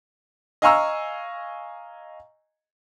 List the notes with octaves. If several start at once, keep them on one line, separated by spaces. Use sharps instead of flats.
D#5 F5 G#5 A#5 C#6 E6